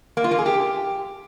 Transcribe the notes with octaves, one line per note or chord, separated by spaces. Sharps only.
A#3
F4
A#3
G#4
G4